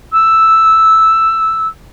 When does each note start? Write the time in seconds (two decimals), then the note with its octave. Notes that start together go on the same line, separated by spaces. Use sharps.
0.12 E6